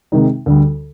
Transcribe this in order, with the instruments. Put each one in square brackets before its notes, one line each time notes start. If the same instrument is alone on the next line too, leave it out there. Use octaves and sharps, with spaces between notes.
[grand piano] C3 D#3 G#3 D#4
D2 D3 G3